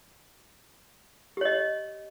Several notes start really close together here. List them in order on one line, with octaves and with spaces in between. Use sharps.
G4 C#5 D#5